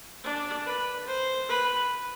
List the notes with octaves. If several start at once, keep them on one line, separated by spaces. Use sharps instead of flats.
D4
B4
C5
B4